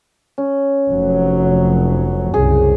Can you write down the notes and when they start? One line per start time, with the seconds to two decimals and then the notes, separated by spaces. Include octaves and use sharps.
0.38 C#4
0.90 F1 F#3
2.34 C2 F#2 C#3 G#4